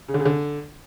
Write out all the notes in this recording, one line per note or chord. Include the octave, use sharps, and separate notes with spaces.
C#3
D3
C#3
D3